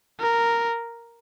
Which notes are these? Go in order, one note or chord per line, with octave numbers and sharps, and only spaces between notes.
A#4